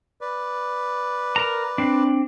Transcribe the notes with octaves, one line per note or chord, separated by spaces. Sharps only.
B4 D5
A#4 A#5
C4 D4